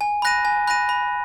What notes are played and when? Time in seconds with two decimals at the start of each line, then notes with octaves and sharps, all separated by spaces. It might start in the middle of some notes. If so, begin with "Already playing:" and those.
0.01 G#5
0.22 B5 F#6 A#6 D#7
0.45 G#5
0.67 B5 F#6 A#6 D#7
0.89 B5